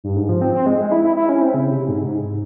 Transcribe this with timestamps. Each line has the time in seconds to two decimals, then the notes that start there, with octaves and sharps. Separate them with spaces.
0.04 G2
0.16 G#2
0.29 F3
0.41 C4
0.54 C4
0.66 G#3
0.79 G#3
0.92 E4
1.04 E4
1.17 E4
1.29 C#4
1.42 C4
1.54 C#3
1.71 C3
1.88 G#2
2.04 G#2